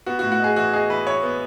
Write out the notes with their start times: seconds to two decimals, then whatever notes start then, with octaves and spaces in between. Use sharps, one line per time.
0.06 B3 F#4
0.19 F#4
0.23 A2
0.32 F#4
0.40 D#4 G#4
0.56 E3 F#4
0.73 D#4 G#4
0.90 E3 B4
1.06 E3 C#5
1.23 B3